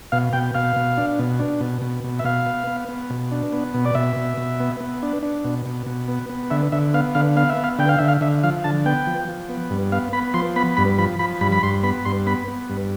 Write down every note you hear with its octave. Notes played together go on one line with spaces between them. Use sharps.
B2 F5
B2 G5
B2 F5
B2
D4
B2
D4
B2
B2
B2
E5
B2 F5
B3
B3
B3
B2
D4
B3
B2
D5
B2 E5
B2
B2
B3
B3
D4
D4
B2
B2
B2
B3
B3
D3 E5
D3 E5
B3 F5
D3 F5
B3 F5
E5
B3
F5
D3 G5
F5
D3 E5
F5
D3 E5
F3 F5
D3 A5
B3 G5
F3
F3
B3
G2
B3 F5
B3 B5
F3 C6
B3 B5
G2 B5
F3 B5
F3 B5
G2 B5
B5
G2 C6
B3 B5
G2 C6
B3 B5
B3
G2